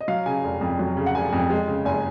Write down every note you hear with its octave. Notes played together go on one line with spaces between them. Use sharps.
D#5
F#3 F5
C#3 G#5
F1
F2
F#3
C#3
F#5
F1 G#5
F2
G#3
C#3
F#1 G#5